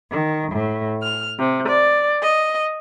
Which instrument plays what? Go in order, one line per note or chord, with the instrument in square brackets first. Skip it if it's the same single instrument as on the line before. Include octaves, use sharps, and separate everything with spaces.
[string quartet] D#3
A2
F6
C3
D5
D#5